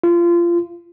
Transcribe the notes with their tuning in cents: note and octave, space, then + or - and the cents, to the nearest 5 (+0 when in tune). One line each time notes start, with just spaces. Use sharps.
F4 -25